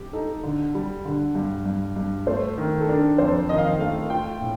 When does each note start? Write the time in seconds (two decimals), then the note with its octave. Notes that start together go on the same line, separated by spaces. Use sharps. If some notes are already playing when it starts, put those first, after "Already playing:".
Already playing: G4
0.13 D#4 A4
0.43 D3
0.75 G3
1.05 D3
1.35 G2
1.65 G2
1.96 G2
2.27 A3 C5
2.57 D#3 A#4
2.81 A4
2.89 D4 A#4
3.18 F2 C5
3.49 D#3 D#5
3.58 F5
3.66 D#5
3.79 A3 F5
4.10 F4 G5
4.41 A2